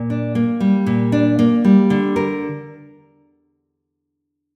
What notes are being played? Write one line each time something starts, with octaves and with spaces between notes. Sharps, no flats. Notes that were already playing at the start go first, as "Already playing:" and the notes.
Already playing: A#2
D4
A#3
G3
A#2
D4
A#3
G3
D3
A#4